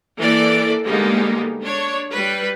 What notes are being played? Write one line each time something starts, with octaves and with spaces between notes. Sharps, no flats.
E3 A#3 A4 D5
D3 G3 G#3 A#3 B3 D#4
D4 C#5
G3 B4